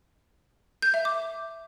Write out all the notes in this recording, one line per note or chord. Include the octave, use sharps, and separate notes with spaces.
G6
E5
D6